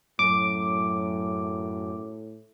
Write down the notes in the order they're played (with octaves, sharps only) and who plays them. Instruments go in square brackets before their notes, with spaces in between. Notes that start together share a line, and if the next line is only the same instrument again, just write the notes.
[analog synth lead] F#2 [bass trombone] A2 [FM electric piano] D6